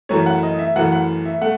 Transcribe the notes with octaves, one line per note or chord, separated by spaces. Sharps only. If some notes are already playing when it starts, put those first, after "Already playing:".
F#2 E3 A3 C#5
F#5
D#5
E5
F#2 E3 A3 F#5
F#5
E5
A3 F#5